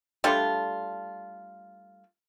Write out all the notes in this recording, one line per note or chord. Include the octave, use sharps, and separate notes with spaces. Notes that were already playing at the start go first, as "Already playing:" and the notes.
G3 A3 D4 F4